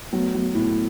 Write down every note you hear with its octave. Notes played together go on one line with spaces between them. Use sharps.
F#3 A3 B3
F#3
A2